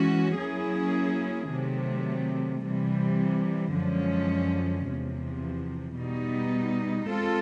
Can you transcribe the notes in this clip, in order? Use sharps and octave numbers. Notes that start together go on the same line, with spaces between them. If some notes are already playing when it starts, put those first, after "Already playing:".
Already playing: E3 G#3 C#4 F#4
F#3 A#3 C#4 E4 G#4
C3 D#3 F#3 A3
C3 E3 G3
F#2 D3 F3 G#3 C#4
E2 C3 F3
B2 G3 B3 D#4
G#3 C4 F4 A4